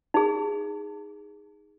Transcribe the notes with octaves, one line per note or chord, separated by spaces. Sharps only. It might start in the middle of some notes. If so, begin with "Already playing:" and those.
D#4 G#4